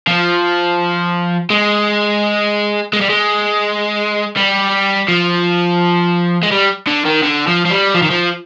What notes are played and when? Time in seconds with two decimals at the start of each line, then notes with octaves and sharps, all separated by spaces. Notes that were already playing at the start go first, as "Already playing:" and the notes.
0.08 F3
1.50 G#3
2.93 G#3
3.01 G3
3.10 G#3
4.37 G3
5.08 F3
6.43 G#3
6.51 G3
6.87 D3
7.05 D#3
7.23 D3
7.47 F3
7.66 F3
7.71 G3
7.94 F3
8.02 D#3
8.10 F3